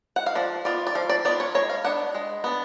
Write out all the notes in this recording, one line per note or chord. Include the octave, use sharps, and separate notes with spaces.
F#5
F5
F3 D5
B3 F4 D5
D5
F3 F5
D5
B3 F4 D5
C#5
G#3 C#5
F5
B3 D4 F#5
G#3
B3 D4